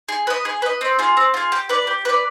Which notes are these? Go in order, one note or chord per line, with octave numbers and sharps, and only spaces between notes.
G#4
B4 D#5
G#4
B4 D#5
C4
F4 G#4
C4
F4 G#4
G4
B4 D5
G4
B4 D5